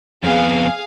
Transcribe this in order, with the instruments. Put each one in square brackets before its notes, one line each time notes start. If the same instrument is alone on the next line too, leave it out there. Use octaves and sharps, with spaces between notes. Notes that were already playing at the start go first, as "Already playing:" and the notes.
[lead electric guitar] F2 B3 [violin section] G#4 F5